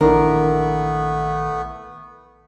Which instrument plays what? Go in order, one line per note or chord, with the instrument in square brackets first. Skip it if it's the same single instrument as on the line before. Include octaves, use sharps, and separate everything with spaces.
[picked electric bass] A#1 D#3 [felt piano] E3 D4 [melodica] A3 B3 [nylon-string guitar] A#4